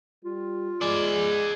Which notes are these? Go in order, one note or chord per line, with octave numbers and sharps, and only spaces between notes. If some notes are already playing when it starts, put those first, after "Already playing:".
G3 F4
G#3 G#4 D5